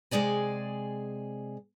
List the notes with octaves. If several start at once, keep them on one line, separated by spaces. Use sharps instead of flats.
C3 G#3 G#4 D5 G#5